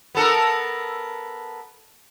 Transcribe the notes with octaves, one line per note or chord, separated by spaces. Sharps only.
B3 A4 A#4